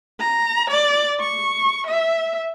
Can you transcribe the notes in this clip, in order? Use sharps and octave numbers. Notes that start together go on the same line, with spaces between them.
A#5
D5
C#6
E5